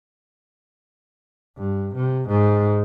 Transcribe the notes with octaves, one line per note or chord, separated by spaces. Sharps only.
G2
C3
G#2